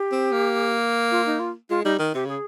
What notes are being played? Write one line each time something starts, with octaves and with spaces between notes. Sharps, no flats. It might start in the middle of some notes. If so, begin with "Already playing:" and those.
Already playing: G4
C4
A#3
F4
D#4
F4
G#3 F4
G3 D#4
D#3
C3 G4
C#3 G#4